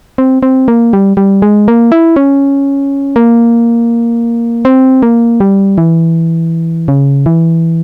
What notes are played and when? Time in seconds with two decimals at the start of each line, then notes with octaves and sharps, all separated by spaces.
0.18 C4
0.43 C4
0.68 A#3
0.93 G3
1.17 G3
1.42 G#3
1.68 A#3
1.92 E4
2.16 C#4
3.16 A#3
4.65 C4
5.03 A#3
5.40 G3
5.78 E3
6.88 C#3
7.26 E3